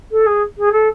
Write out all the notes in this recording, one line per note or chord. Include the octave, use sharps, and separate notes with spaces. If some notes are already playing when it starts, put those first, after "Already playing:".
A4
G#4
G#4
A4